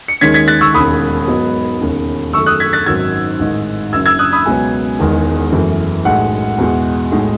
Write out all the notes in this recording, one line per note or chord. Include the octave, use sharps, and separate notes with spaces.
C#7
D#2 D#3 G#3 C#4 G#6 B6
G#6 B6
F#6 A6
C#6 E6
E1 D#2 C#3 B5 D#6
G#2 F#3 B3 D#4
E1 D#2 C#3
F#2 D#3 A3 C#6 E6
D#6 F#6
G#6 B6
F#6 A6
G#1 F#2 D#3 F#3 E6 G#6
A1 G#2 D#3 G#3 D#4
F#1 F#2 C#3 E6 G#6
E6 G#6
D#6 F#6
B5 D#6
C#2 B2 F#3 B3 G#5
E1 E2 D#3 G#3
F#1 F#2 C#3 E3 A3
B1 A2 G#3 F#5
E2 B2 G#3
B1 A2 G#3 D#4